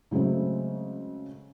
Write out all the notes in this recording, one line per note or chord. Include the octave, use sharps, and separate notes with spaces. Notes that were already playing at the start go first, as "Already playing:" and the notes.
C#3 F#3 G#3 A3 C4